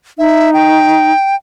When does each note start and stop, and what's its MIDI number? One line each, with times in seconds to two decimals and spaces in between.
0.18 1.12 63
0.18 0.50 76
0.54 1.35 79